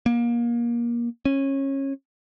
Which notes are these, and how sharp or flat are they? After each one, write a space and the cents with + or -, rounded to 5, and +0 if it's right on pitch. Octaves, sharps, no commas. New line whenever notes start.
A#3 +25
C#4 -25